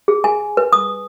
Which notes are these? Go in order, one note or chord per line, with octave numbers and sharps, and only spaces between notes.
G#4
G#5
B4
D#6